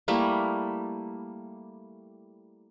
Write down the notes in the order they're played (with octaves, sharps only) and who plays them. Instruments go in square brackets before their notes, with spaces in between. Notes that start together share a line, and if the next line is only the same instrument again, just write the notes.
[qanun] G3 A3 A#3 E4